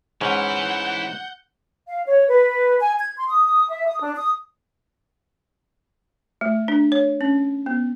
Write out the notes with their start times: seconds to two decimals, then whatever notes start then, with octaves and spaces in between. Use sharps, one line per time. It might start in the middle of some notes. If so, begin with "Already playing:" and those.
0.21 G#2 E3 C#4 E4 F#5 G6
1.88 F5
2.07 C#5
2.28 B4
2.80 G#5
2.98 G#6
3.17 C6
3.29 D#6
3.70 E5
3.87 D#6
4.00 D4
4.15 D#6
6.41 A3
6.68 D4
6.92 C#5
7.21 C#4
7.66 B3